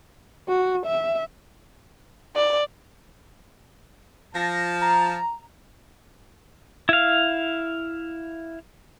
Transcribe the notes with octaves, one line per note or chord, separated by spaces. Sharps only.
F#4
E5
D5
F3 A5 A#6
A#5
E4 F5